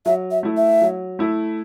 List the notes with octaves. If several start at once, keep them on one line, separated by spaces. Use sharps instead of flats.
F#3 E5
E5
A3 E4
E5
F#3
A3 E4